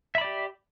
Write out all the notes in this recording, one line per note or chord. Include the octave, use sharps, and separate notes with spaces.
G4 D5 E5 B5